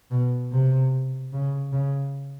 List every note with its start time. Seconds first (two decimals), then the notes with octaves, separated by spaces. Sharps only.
0.11 B2
0.52 C3
1.33 C#3
1.73 C#3